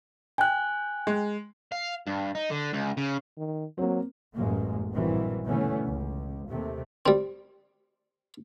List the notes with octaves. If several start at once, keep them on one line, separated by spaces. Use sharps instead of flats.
G5 G#5 F#6
G#3
F5
G2
D#4
D3
C#2
C#3
D#3
F#3 A#3 C4
A1 F#2 G#3 A#3
A#1 G2 D#3 E3 F#3 C4
B2 D3 E3 A3 B3 C#4
C#2
D#2 C3 A3
G3 C4